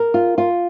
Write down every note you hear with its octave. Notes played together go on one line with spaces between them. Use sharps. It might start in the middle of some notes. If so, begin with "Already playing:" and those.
Already playing: A#4
F4
F4